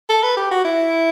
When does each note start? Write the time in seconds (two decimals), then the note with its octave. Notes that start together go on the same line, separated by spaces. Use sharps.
0.09 A4
0.23 B4
0.37 G4
0.51 F#4
0.64 E4